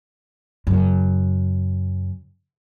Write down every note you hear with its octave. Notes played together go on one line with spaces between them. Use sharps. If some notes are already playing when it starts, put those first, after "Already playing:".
F#2 C#3